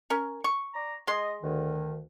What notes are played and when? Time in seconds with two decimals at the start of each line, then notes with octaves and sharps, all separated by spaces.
0.10 C#4 A#4
0.44 C#6
0.74 D5 A#5
1.07 G#3 D#5 C6
1.42 D2 D#3